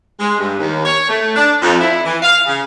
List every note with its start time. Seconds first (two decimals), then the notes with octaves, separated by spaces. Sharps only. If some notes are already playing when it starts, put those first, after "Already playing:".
0.19 G#3
0.39 G2
0.59 D#2
0.85 C#5
1.09 A3
1.36 D4
1.62 F2
1.81 E4
2.05 E3
2.23 F5
2.46 C#3